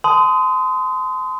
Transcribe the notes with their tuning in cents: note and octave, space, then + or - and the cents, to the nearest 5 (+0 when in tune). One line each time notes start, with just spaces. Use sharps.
A5 -30 C6 -30 D#6 +10